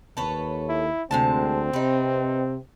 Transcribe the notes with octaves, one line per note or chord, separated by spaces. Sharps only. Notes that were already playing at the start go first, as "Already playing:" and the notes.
D#2 A4 B4 C#5
E4
D2 C3 G#3 C4 A5
C3 D#4 B4